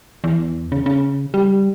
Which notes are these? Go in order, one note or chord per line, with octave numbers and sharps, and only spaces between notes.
E2
C#3
C#3
G3